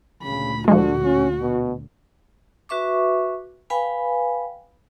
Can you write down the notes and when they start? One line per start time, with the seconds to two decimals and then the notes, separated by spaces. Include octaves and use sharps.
0.23 D2 A#2 C#3 B5
0.68 D3 F3 G#3 F#4
1.04 C#4
1.42 B2
2.69 F#4 B4 E5 C#6 D6
3.70 B4 F5 G5 G#5 B5